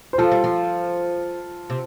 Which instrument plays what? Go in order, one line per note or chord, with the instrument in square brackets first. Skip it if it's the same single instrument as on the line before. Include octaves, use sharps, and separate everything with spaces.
[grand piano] C5
[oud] F3 [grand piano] F4 A4
[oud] G3
F3
C3